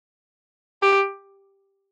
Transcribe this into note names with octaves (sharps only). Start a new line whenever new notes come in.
G4